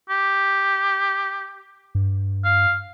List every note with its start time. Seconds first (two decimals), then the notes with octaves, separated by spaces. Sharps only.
0.10 G4
1.95 G2
2.45 F5